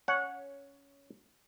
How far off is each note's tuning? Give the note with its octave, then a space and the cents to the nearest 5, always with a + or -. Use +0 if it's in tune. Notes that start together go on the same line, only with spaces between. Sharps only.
C#4 +10 C#5 +5 F#5 -15